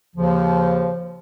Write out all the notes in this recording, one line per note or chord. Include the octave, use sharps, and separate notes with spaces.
D#2 C#3 F3